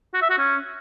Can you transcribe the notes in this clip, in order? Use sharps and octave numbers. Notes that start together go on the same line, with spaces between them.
F#4
E5
F#4
C#4